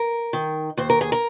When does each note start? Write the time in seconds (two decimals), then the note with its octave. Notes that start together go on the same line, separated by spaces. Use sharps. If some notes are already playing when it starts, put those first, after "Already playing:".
Already playing: A#4
0.33 D#3
0.77 D#2 C5
0.90 A#4
1.01 G#4
1.12 A#4